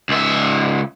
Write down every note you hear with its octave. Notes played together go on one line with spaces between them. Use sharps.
C#2 E5